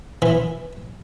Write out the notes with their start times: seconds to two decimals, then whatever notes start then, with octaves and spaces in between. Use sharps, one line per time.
0.22 E3